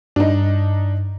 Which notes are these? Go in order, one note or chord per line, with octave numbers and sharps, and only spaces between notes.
G2 D4 D#4